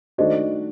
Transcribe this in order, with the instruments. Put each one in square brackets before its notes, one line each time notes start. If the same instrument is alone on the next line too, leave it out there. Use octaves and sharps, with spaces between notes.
[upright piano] D#3 A3 D4 F#4 [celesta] C5 D#5